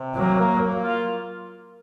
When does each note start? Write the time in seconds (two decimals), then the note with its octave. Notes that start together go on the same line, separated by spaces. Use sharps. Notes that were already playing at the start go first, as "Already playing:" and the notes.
Already playing: C3
0.16 F#3 A#3
0.38 A#3
0.61 A#3
0.83 F4